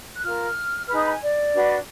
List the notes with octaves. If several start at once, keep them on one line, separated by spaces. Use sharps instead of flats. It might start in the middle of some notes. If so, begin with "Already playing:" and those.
F#6
F4 A#4 F6
D#4 G#4 B4 D#6 F6
B5
G#5
D5
D4 F#4 B4